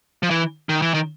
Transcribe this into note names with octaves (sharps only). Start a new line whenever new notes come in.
F3
E3
D#3
E3
D#3